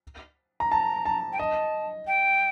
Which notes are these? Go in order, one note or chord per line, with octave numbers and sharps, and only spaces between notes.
A#5
A5 A#5
A5
G5
D#5 A5
G5